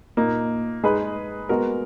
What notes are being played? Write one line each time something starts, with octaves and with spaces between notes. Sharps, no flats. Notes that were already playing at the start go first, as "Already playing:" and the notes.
A#2 A#3 D#4
G#3 D#4 G#4 B4
G#3 B3 F#4 A#4